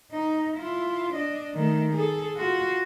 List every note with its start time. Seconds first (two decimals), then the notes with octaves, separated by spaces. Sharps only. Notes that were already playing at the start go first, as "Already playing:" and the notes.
0.12 D#4
0.57 E4 F4
1.13 D4 D#5
1.55 D#3 A3
1.93 G#4 A4
2.37 F4 F#4